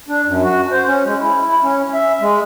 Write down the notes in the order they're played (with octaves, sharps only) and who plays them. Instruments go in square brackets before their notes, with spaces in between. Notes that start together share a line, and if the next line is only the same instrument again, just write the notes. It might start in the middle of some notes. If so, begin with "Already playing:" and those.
[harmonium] D4
F#2
F#4
C5
C#4
G#3
E4
E4
C#4
E5
G#3